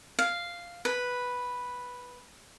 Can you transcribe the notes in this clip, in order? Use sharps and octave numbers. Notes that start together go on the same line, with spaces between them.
F5
B4